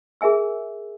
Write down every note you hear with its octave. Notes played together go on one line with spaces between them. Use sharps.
G#4 A#4 E5 G#5 E6